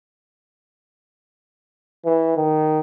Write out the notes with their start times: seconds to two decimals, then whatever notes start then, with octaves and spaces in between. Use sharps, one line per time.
2.05 E3
2.36 D#3